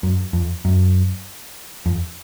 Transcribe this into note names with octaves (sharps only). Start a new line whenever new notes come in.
F#2
F2
F#2
F2